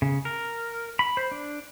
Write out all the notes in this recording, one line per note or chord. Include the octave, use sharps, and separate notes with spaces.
C#3
A#4
B5
C5
D4